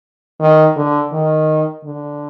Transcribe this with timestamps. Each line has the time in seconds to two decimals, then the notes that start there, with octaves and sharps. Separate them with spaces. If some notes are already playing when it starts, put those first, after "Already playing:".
0.40 D#3
0.77 D3
1.12 D#3
1.84 D3